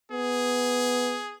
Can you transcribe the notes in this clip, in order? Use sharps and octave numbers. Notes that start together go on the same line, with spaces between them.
B3 G#4